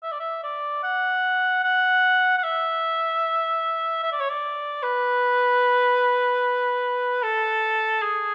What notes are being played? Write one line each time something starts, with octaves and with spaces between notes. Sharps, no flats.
E5
D5
E5
D5
F#5
F#5
F#5
E5
E5
D5
C#5
D5
B4
A4
G#4